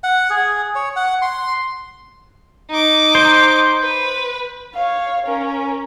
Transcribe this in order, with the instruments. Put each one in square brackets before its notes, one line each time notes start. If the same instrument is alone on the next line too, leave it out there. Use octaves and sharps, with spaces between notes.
[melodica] F#5
G#4
C#5
F#5
C6
[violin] D#4 D6
[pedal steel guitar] C5
[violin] B4
[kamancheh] C#5 F5
C#4 A#4